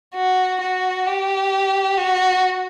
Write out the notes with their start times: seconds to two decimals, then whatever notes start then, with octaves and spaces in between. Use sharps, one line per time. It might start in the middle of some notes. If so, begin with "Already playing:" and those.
0.15 F#4
0.61 F#4
1.07 G4
1.97 F#4